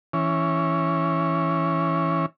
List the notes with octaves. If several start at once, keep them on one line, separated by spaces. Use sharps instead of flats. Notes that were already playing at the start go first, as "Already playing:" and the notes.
E3 C#4